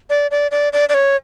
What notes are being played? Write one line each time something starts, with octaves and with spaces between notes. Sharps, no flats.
D5
D5
D5
D5
D5
C#5